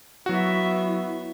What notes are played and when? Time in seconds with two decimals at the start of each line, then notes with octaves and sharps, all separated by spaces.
0.26 F#3 B3 E4 F#4 E5